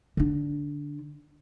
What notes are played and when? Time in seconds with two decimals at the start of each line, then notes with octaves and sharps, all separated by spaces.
0.17 D3 D4